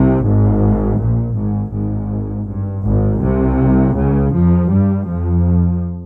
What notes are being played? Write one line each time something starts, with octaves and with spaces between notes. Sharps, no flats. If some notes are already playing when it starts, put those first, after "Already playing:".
Already playing: C2 C3
G#1 G#2
A#1 A#2
G#1 G#2
G#1 G#2
G2
G#1 G#2
C2 C3
C#2 C#3
F2 F3
G2 G3
F2 F3